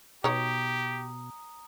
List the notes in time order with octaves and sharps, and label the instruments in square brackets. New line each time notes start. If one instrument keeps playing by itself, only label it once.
[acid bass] B2 [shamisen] D#4 C#5 [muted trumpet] G4 [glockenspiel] A#5 D#6